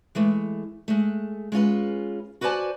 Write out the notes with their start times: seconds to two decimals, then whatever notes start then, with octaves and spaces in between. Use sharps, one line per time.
0.15 E3 G#3 A3
0.88 G#3 A3
1.52 G#3 C#4 F4 B4
2.41 F#4 B4 C5 D5 G#5 A5